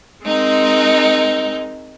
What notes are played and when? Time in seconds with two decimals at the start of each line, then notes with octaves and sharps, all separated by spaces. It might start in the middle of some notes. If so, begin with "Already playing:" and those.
0.23 G#3 C4 D#4 A#4